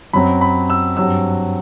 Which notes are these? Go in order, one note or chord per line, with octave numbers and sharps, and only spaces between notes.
F#2 F#3 C4 B5
B5
E6
G2 F#3 C4 E6